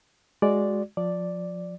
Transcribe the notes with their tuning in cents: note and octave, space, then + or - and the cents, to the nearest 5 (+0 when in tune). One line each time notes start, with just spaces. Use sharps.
G#3 +0 F#4 +0 D5 +0
F3 +25 D5 +0